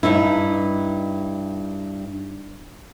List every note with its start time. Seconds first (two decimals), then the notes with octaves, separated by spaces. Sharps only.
0.03 G2 D#4 E4